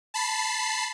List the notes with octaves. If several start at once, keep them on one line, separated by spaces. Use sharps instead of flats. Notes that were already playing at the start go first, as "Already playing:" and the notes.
A5 B5 C7